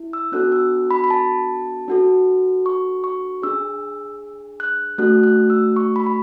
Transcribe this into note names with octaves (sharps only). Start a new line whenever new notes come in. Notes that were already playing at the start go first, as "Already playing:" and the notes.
Already playing: E4
E6
B3 D4 F#4 A4 F#6
E6
B5
B5
A5
D4 F#4 A4
C#6
C#6
D4 G#4 E6
F#6
A3 D4 F#4 A4 F#6
F#6
E6
C#6
B5
B5